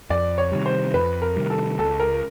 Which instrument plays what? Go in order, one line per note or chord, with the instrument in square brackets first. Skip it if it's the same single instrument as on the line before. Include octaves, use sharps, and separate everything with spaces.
[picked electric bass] F2 [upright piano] D5
[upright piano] C#5
[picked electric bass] C3 D#3 G3
[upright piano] C5
[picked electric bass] F2 [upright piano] B4
[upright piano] A#4
[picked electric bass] C3 D#3 G3
[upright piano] A4
[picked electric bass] C#2 [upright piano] A4
[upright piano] A#4